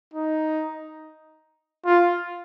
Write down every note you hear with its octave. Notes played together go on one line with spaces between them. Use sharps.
D#4
F4